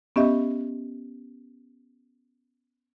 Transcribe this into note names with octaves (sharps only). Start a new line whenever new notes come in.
B3 C#4 G4 D#5 E5